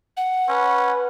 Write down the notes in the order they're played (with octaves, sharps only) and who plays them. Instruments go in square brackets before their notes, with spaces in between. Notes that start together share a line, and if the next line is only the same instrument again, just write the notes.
[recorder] F#5
[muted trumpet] C#4 [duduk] B4